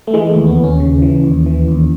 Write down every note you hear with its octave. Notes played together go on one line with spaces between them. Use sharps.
A3
E3 G#3
A3
D#2
B3
D#2
C#4
C#3
E3
D#2
E3
D#2